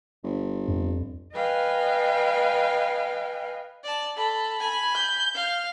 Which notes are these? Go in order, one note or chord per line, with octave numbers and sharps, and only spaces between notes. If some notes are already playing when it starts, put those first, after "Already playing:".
G1
F2
B4 D#5 F5 G5 G#5
D5 A5
A4 B5
G#5 B5
G6
F5